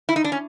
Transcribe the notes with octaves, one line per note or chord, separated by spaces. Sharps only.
E4
D#4
D4
C#4